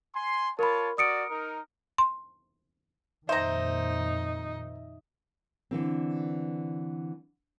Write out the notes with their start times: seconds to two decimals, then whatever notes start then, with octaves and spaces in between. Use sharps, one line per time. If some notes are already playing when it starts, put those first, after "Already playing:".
0.14 G#5 C6
0.59 F4 A#4 C#5 A5 B5
0.98 F#4 A#4 D5 D#6 C#7 D7
1.29 D#4 A#4
1.98 C6
3.29 F2 A#2 D#3 D#4 C5 E5 A#5
5.71 D3 E3 C4